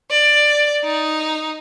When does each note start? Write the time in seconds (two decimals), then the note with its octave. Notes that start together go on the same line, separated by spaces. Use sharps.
0.10 D5
0.84 D#4